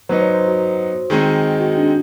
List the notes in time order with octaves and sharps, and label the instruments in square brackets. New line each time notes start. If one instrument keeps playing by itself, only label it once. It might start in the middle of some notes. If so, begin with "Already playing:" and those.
[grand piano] F#3 B3 D#4 [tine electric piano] C5
[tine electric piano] C#5
C5
F#4
[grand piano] D#3 G#3 C4 D#4
[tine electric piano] F#4
D4